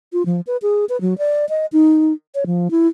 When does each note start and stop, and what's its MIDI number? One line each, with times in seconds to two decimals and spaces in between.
0.13 0.25 65
0.26 0.41 53
0.47 0.57 71
0.62 0.85 68
0.89 1.00 71
1.01 1.17 54
1.18 1.45 74
1.49 1.66 75
1.73 2.13 63
2.35 2.44 73
2.46 2.71 53
2.71 2.87 64